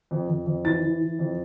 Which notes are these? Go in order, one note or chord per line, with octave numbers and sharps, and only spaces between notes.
F2
F2
F2
E3 A6
E3
E3
F2